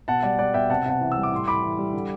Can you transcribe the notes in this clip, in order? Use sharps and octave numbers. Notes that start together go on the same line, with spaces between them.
B2 F#5 A5
G3 D5 F#5
G3 D5 F#5
B2 E5 G5
C3 F#5 A5
C3 F#5 A5
E3
E6
G3
D6
A2 C6
A2 B5 D6
E3
G3
D3